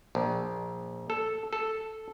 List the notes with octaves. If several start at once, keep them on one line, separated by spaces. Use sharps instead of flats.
A#1
A4
A4